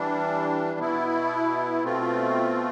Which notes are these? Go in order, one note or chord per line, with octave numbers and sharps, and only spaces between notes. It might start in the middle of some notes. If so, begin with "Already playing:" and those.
Already playing: E3 G3 D4
B2 B3 E4
B2 A3 C4 F4